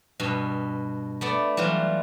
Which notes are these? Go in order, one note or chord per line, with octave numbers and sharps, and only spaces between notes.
G2 B2
A3 B3 D5
E3 F#3 G3 F4